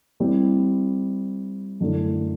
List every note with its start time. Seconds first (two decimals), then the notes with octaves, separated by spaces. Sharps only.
0.20 G3 C4 E4
1.80 F#2 D3 A3 E4